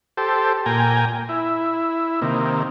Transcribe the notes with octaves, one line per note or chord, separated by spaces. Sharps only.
G4 A4 C5
A#2 G5 G#5 A#5
E4
C3 D#3 A#3